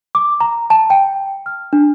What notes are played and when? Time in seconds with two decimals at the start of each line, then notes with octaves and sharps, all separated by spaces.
0.15 D6
0.41 A#5
0.70 A5
0.90 G5
1.46 F6
1.73 D4